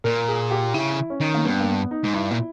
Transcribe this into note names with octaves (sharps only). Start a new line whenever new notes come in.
A#2 A#4
G#4
G4
C#3 E4
C#4
D#3
A#3
G2 B3
A#3
B3
D#4
G#2
G2 E4
A#2